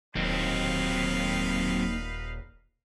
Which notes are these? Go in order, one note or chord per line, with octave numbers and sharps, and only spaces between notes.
D#1 D#2 F#3 C4 D#4 B4 F5